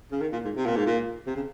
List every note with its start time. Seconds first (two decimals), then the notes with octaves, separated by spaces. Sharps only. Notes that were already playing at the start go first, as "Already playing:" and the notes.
0.12 C#3
0.21 D#3
0.33 A#2
0.45 G#2
0.57 C3
0.66 A#2
0.76 G#2
0.86 A#2
1.27 C3
1.36 C#3